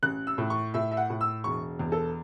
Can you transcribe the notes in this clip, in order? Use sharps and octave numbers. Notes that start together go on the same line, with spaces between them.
A1 F#6
E6
A2
C#6
A2 E5
E5
F#5
A2
E6
E1 C#6
E2
A4